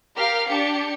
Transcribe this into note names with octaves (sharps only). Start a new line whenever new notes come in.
G4 A#4 F5 F6
D4 G4 C#7